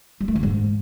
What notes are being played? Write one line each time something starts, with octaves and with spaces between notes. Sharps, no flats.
G3
A3
D3
G#2